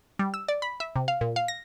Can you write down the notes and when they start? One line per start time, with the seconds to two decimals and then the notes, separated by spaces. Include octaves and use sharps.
0.19 G3
0.34 E6
0.48 D5
0.62 B5
0.80 E5
0.96 C3
1.08 F5
1.21 A#2
1.36 F5
1.48 A#6